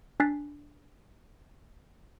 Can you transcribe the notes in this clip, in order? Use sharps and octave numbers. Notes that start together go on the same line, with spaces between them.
D4 G#5 F#6 A6 B6 C7